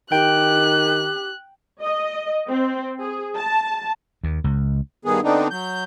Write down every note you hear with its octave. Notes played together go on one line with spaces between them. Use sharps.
D#3 G4 G5 F#6
D#5
C4
G#4
A5
D#2
C#2
G2 D#3 B3 G#4
D3 B3 C4 D4 D#4
F#3 G6